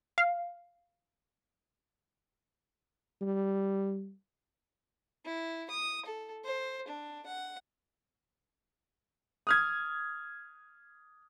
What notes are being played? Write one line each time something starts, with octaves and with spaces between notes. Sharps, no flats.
F5
G3
E4
D#6
A4
C5
D4
F#5
D#6 F6 G#6